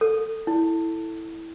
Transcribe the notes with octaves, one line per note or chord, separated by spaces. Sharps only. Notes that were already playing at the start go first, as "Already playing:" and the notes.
A4
E4